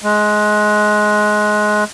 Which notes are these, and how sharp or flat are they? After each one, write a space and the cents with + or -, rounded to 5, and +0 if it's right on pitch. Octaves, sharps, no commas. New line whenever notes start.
G#3 +20